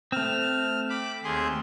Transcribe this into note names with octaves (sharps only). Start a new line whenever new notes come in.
A3 C4 F6
B5 D6
D#2 G#4 C6